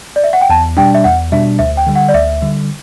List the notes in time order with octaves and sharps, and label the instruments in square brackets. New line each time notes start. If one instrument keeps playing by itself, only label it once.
[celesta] D5
E5
F#5
G5
[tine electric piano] E2 [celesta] A5
[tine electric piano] B2 G3 D4 [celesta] G5
[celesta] E5
[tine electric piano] E2 [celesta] F#5
[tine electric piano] B2 G3 D4 [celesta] E5
[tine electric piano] D2 [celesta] E5
[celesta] G5
[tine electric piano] D3 G3
[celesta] F#5
D5
[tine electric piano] D2 [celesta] E5
[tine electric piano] D3 G3